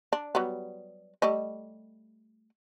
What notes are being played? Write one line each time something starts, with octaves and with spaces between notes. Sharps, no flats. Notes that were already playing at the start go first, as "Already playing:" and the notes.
D4
F#3 G3 B3
G3 A3 D#5